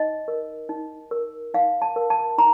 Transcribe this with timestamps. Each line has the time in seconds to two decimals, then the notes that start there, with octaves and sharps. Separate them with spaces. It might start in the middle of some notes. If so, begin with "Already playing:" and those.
Already playing: D#4 D#5
0.28 A#4
0.69 D#4
1.11 A#4
1.54 D#4 F5
1.82 A5
1.96 A#4
2.10 A5
2.38 D#4 A#5